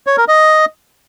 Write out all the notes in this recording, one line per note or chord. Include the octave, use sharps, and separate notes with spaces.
C#5
A#4
D#5